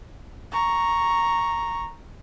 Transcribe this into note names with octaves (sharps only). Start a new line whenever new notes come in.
A#5 C#6